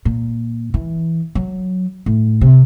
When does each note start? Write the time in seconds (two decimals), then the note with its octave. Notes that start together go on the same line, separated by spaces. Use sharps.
0.05 A#2
0.74 E3
1.35 F#3
2.06 A2
2.41 C3